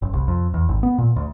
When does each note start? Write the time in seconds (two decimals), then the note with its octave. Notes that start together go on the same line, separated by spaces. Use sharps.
0.02 F#1
0.13 C2
0.28 F2
0.54 E2
0.69 G#1
0.83 B3
0.98 A#2
1.16 D2